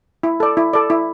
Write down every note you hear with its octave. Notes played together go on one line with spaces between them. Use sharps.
E4
A4 D5
E4
A4 D5
E4